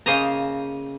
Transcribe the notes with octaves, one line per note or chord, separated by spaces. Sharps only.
C#3 A#3 C5 D#5 G#5 A#5